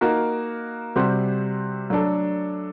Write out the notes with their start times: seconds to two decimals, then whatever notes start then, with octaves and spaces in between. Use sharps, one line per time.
0.01 A#3 D#4 F#4 A#4
0.96 C3 G3 C4 F#4
1.90 F#3 A3 D4 A4